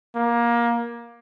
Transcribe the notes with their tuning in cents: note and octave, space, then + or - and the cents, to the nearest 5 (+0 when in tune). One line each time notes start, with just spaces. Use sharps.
A#3 +20